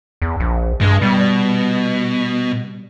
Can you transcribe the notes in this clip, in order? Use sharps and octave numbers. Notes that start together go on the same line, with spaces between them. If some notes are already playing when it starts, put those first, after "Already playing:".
E2
A#1
G2 G#3
B2 G3